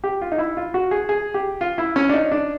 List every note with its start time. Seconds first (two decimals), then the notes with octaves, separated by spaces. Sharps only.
0.04 G4
0.21 F4
0.32 D#4
0.38 E4
0.57 F4
0.74 F#4
0.91 G#4
1.09 G#4
1.34 G4
1.61 F4
1.78 E4
1.96 C#4
2.09 D4
2.14 D#4
2.32 D4